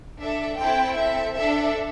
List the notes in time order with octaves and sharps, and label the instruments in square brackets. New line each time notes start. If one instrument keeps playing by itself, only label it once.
[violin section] D4 A4 E5
C4 E4 A4 G5
C4 A4 E5
D4 A4 E5